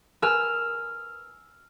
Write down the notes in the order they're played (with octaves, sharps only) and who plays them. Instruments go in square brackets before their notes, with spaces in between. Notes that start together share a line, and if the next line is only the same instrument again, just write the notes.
[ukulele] A#4 B4 G#5 [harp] E6 F6